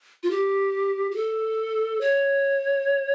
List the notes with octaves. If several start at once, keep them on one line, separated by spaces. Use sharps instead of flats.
F4
G4
G4
A4
C#5